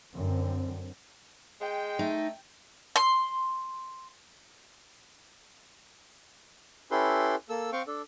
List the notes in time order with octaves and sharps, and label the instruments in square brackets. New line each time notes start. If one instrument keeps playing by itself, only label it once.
[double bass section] F#2 D3 C4
[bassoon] G#3 [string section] G5
[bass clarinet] A3 [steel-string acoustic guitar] D#4
[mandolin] C6
[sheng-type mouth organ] C#4 E4 G4 A4 B4 C6
A#3 A4 E6
C4 F5 G5 C#6
D4 A4